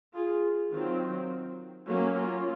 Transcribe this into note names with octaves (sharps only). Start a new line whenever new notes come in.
F4 G#4
D#3 F#3 C4 F4
F#3 A#3 C#4
F4